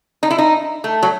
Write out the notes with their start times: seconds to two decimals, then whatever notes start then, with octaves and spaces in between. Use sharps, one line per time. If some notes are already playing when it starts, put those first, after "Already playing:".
0.23 D#4
0.31 E4
0.38 D#4
0.84 A3
1.03 F#3